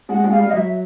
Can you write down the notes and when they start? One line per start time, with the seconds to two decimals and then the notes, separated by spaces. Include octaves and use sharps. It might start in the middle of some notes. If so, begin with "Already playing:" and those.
0.09 G#3 F#5
0.24 G#3
0.31 F5
0.39 G3
0.49 D#5
0.53 F#3 E5